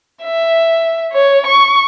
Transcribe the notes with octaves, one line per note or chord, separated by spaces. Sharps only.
E5
C#5
C#6